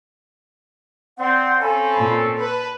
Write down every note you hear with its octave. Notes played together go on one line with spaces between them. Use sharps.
C4 D5 F#5 C6
C4 C#4 A4 F5 G#5 B5
A#2
B4 A5